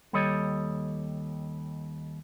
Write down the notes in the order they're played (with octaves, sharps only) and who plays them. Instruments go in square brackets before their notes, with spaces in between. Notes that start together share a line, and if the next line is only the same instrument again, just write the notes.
[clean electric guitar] D#2 G3 A4 C#5 D#5